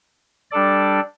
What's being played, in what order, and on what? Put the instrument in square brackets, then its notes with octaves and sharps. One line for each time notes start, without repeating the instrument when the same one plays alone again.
[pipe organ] G3 D4 A4 D5